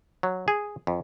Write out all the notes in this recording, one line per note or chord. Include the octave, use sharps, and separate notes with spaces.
F#3
G#4
F2